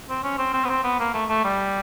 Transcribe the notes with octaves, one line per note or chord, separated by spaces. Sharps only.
C4
C#4
C4
C4
B3
C4
B3
A#3
A3
A3
G3